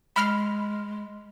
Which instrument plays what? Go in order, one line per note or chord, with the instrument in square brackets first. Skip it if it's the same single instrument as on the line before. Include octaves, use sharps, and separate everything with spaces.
[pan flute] G#3 [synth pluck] B5 F6 C7